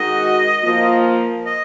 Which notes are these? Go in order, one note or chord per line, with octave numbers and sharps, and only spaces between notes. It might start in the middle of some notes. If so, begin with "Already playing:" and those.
Already playing: D#3 G#3 D#4 F#4 D#5
F3 A#3 F4
D#5